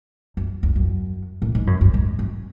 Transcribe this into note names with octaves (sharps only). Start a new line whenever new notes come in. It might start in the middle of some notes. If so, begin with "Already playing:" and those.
F#2
E2
F#2
A2
G#2
F#2
F#2
G#2
F#2